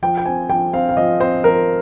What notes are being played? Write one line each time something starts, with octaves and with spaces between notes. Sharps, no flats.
F3 G5
G5
C4 G#5
F3 G5
C4 F5
F5
F3 D#5
C4 C5
F3 A#4